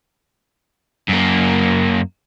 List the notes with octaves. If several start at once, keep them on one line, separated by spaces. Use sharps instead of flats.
F#2 A#3